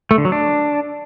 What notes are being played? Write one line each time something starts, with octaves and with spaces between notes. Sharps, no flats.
A3
D3
F#3
D4